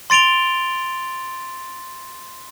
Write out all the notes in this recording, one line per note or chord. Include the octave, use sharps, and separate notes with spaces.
C6 A6 D7 F7 G7